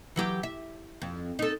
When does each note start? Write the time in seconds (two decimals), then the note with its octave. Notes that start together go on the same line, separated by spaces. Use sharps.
0.16 E3 F#3 G4
0.43 E5
1.02 F2
1.39 D#4 A4